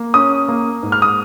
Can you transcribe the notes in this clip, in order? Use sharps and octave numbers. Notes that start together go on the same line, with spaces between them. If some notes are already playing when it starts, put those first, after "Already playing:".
Already playing: A#3
C#4 D#6
A#3
G#2
F6
D#6